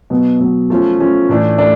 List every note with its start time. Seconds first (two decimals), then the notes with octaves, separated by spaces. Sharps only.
0.10 B2 F#3 B3
0.40 B2 F#3 B3
0.70 F3 A3 C#4 F4
0.99 F3 A3 C#4 F4
1.29 A2 E3 A3 D4
1.58 A3 D4